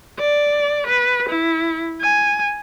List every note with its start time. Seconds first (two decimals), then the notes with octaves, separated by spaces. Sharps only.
0.19 D5
0.87 B4
1.29 E4
2.01 G#5